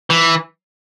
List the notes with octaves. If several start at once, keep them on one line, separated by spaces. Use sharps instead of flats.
E3